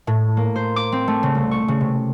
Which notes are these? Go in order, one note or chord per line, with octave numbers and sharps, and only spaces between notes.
A2
A#3
C5
D6
C4
A3
C#3
C2
C#6
C#3
C3